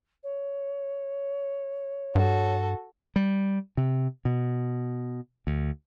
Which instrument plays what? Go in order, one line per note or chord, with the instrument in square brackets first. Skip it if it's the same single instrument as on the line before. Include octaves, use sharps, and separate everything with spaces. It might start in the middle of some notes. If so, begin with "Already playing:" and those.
[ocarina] C#5
[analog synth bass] G2 [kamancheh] F#4 A4
[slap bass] G3
C3
B2
D2